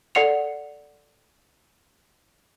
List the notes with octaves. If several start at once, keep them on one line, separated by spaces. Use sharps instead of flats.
A4 D5 F#5 C#7 F7